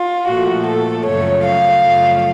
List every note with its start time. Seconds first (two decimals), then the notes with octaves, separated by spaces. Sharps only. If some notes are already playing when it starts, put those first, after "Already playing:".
Already playing: F4
0.28 A#2 F3 A3 F#4
0.66 A4
1.05 F#2 C#3 F3 A3 C#5
1.44 F5
1.83 F#2 C#3 F3 A3